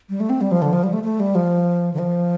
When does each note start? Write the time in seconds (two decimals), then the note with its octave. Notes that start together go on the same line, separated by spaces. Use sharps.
0.09 G3
0.20 A3
0.30 C4
0.41 G3
0.51 F3
0.62 D3
0.73 F3
0.83 G3
0.93 A3
1.04 A3
1.20 G3
1.35 F3
1.94 D3
1.99 F3